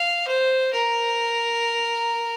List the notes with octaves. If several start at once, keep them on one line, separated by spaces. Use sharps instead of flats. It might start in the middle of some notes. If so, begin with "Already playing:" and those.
Already playing: F5
C5
A#4